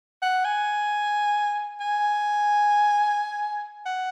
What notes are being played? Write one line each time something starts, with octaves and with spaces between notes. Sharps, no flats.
F#5
G#5
G#5
F#5